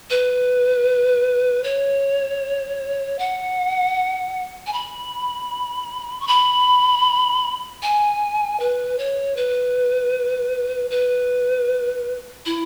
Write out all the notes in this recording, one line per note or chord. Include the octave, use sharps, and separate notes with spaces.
B4
C#5
F#5
G#5
B5
C#6
B5
G#5
B4
C#5
B4
B4
E4